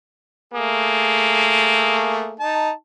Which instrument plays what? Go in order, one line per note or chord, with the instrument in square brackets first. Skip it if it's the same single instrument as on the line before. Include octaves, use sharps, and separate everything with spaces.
[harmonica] A3 G#4 [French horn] A#3
[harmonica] D#4 A5